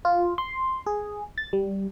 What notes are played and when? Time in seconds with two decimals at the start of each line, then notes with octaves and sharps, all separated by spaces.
0.05 F4
0.38 C6
0.86 G#4
1.38 A6
1.53 G3